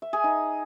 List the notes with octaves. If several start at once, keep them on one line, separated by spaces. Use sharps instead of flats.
E5
G#4
D#4